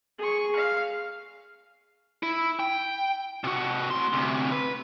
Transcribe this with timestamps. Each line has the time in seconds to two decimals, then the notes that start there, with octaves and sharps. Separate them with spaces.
0.19 G#4 C#6
0.56 F5
2.23 E4
2.60 G5
3.44 C3 F#4
3.90 A2 C6
4.13 D2 C3
4.52 B4